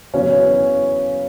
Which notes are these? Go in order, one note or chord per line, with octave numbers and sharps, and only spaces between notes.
F#2 C#3 E3 B3 C#4 F#4